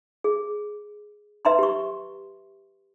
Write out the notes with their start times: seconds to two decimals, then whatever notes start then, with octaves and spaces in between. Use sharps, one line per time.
0.24 G#4
1.45 B4 E5 A#5 C6
1.59 G4 C#6